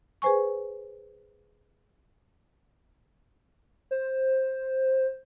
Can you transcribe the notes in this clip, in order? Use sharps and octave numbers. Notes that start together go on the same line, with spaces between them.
G#4 B4 C5 G#5 C#6
C5